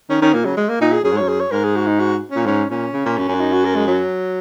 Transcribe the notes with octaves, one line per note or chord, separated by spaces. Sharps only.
D#3 C#4
D#3 C#4
A#2 A#3
C#3 F#3
G#3
A#3
A#2 D#4
G#4
F#2 G#4
G#2
F#2 C#5
G#4
C#5
G#2 A#4
G#4
F#4
D#4
F#4
A#2 C#4
G#2 C#4
A#2 C#4
C#3
A#2
F#2
F#2
F#4
D#4
F#4
A#4
G#3
F#3